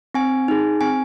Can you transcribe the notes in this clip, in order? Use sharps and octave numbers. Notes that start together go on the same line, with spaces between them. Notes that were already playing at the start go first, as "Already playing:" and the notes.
C4 G#5
D#4 G#4
C4 G#5